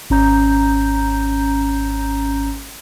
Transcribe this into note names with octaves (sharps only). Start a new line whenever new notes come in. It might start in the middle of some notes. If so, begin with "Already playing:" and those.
G#1 C#4 A#5 G6